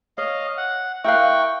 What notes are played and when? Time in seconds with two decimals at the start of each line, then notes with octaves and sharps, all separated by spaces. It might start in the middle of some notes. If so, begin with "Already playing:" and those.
0.18 C#5 D#5 F5
0.57 F#5
1.05 E4 A#4 E5 F5 G5 C#6 F#6